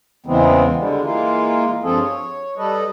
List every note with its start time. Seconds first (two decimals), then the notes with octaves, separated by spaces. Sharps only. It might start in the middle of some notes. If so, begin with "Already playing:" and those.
0.26 E2 C#3 E3 G#3 B3 C4
0.77 D3 G3 G#3
1.02 E3 G#3 A#3 F4
1.83 G2 F3 C4 F4 G#4 A4
2.00 C#5
2.57 G3 A4 B4 D#5